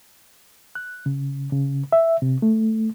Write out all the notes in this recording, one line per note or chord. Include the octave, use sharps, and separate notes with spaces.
F#6
C#3
C#3
E5
C3
A3